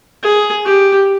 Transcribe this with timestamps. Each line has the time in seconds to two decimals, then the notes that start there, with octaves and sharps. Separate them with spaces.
0.23 G#4
0.65 G4